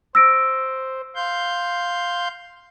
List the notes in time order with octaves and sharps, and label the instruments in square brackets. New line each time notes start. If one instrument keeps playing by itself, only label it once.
[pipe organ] C5 [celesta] E6 A#6 D7
[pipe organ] F5 C6 G6